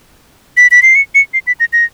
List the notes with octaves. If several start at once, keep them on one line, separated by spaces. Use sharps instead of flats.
B6
B6
C7
C#7
C#7
C7
B6
A#6
A#6